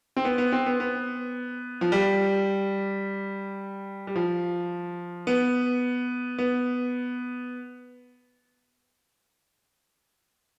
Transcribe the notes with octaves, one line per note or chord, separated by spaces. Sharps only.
C4
B3
B3
C4
B3
B3
F3
G3
G3
F3
B3
B3